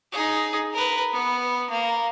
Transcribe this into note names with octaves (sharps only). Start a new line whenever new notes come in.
D#4 G#4
A#4 B4
B3
A#3